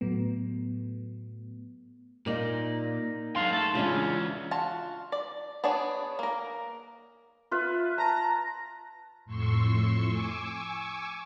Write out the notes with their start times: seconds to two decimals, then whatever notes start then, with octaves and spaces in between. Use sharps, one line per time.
0.01 A2 F#3 A3 B3
2.26 A#2 A#3 D#4 D5
3.36 F#2 D4 G#4 F5 C6
3.53 A3 A4 A5
3.75 C#3 E3 G#3 C#4 D4 F4 C#5
4.51 F4 F#4 A5
5.12 D5
5.64 B3 D4 G#4 C#5 D5
6.19 A#3 A#4
7.51 F4 B4 E5
7.98 A5 A#5
9.26 F2 A2 C6 C#6 E6
10.09 G#5 C#6 D6 E6